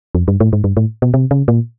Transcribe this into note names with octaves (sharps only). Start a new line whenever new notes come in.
F2
G2
A2
G#2
G2
A2
B2
C3
C#3
A#2